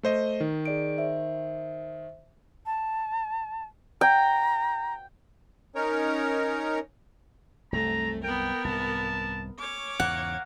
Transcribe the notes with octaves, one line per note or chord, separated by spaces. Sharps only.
A3 C5 D#5
D#3
G#4 D5 D7
C5 E5
A5
G5 A#5
C#4 D#4 A#4 C#5 A#5
C2 F#2 C3 A3 A#5
B3 A#4 G5
C2 G#2 A5
C#4 C#5 D6
E2 G#2 C#3 A#3 F#5